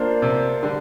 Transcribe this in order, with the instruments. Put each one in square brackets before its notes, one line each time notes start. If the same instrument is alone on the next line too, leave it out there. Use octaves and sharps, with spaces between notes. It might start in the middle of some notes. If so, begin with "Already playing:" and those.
Already playing: [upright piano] A#3 D4 F4 C5
[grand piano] C3
[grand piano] D3 [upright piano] G3 D4